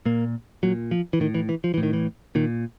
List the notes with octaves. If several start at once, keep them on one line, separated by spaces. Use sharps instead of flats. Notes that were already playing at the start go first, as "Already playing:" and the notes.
A#2 A#3
A#2 F#3
F3
E3
A2 D#3
E3
E3
F3
E3
A2
D#3
E3
A#2 D#3